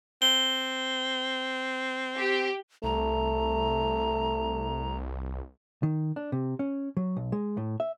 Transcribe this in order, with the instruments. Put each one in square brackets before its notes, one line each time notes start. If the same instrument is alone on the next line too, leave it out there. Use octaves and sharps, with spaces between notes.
[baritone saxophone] C4 [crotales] G7
[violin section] G4
[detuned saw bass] C2 [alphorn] A3 [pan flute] A#5
[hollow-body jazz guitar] D#3
D4
C3
C#4
F#3
B1
G#3
A2
E5